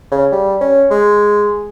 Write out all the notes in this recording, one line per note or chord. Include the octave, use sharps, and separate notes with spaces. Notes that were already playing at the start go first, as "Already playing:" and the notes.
C#3
G3
C#4
G#3